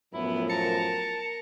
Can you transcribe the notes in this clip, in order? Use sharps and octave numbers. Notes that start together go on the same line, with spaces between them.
F#2 A2 F3 B3 E4
A#4 A5 C#7